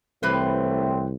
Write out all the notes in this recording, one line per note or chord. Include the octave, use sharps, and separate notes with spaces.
C2 E3 F#3 A3 C4 B4 C5